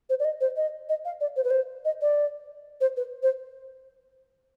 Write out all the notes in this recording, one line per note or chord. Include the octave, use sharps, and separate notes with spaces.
C5
D5
D#5
C5
D#5
D#5
F5
D5
C5
B4
C5
D#5
D5
C5
B4
C5